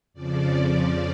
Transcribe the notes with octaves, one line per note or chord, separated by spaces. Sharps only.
F2 C#3 F3 D5